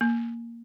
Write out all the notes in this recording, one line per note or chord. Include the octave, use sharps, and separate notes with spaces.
A#3